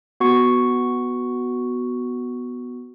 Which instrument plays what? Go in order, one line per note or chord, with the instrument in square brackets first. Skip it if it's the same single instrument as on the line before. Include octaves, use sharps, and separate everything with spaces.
[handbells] B3 F#4 C#6